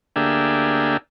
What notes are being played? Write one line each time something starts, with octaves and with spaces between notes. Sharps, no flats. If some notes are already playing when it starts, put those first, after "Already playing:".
D2 A#3 D4 G4 G#4 E5